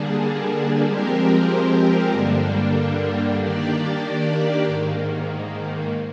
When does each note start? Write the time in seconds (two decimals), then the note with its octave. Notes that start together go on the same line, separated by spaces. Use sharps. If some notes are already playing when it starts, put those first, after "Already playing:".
Already playing: D3 G3 A#3 D4 G#4
0.85 F3 G#3 C4 G4 A#4
2.11 G2 D3 G3 A#3 D4
3.38 D#3 A#3 D4 G4 D5
4.65 G#2 D#3 A#3